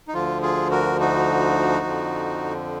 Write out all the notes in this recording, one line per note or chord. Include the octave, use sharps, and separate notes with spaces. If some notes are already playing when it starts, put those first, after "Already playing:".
D#4
D2 D3 F3 F4
F4 G#4
F#4 A#4
D#4 F#4
F2 D3 F3